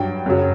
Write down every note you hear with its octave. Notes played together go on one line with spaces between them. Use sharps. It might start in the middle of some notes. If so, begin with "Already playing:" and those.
Already playing: G2 F#3 G5
F#2 C#3 F#3